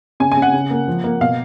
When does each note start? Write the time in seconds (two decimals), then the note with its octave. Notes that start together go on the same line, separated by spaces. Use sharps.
0.20 C#3 G#5
0.32 G#5
0.37 C#3
0.42 F#5
0.54 C#3
0.70 A#3
0.88 F3
1.04 A#3
1.21 B2 F5